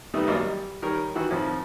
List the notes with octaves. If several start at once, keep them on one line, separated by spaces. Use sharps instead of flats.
D#3 G3 A3 B3 D#4
G#1 G2 F#3 A#3 D5 D#5
G3
D#3 G3 A#4 C#5
D#3 E3 F#4
F2 A2 D#3 F3